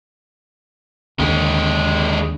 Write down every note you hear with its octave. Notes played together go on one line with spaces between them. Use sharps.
D#2 D3 G#3 G4